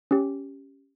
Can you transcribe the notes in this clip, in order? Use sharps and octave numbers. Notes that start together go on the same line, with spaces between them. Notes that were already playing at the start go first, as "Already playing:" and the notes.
C#4 G4